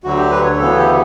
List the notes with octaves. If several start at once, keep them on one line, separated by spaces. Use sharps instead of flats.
D2 D3 F#3 F#4
G4
B4
C#5
D2 C#3 E3 B3 A4
G4